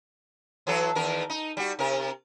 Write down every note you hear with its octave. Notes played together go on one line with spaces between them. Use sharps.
E3 F#3 A4
E2 D#3 A#4
D#4
G3 F#4
C3 A#4